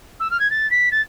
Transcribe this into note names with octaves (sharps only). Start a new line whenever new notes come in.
E6
F6
G#6
A6
B6
A6